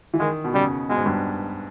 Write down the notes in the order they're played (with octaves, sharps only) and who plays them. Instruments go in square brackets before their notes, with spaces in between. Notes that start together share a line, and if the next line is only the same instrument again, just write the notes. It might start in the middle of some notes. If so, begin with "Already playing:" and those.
[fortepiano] E3
[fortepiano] D#3 [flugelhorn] G#3
[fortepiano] B2
[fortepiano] C#3 [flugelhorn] G3
[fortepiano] B2 [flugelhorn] G#3
[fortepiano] G#2
G2